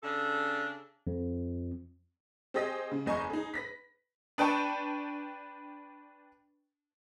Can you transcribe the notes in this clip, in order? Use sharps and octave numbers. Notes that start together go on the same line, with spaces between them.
C#3 D4 A4
F2
C4 G4 G#4 D#5 D#6 A#6
C#3
F#1 E2 D#5 G#5 A#5 C#6
D#4 G#4
B4 A#6 B6
D4 B4 G5 A5 C#6